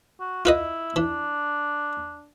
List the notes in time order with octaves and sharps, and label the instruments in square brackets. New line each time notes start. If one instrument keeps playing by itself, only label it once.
[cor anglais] F#4
[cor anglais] E4 [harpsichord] F4 B4 D#5
[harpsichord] E3 [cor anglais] D4